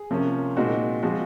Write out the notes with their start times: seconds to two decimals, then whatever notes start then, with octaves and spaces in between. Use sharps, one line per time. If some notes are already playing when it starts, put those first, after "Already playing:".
Already playing: G#4
0.11 C3 F3 A#3 C#4
0.57 A#2 G#3 C4 D#4 F#4
1.03 F3 G#3 C4 F#4